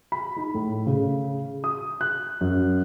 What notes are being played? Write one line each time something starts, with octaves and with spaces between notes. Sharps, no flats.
B5
D#4
A2
C#3
D#6
F#6
F#2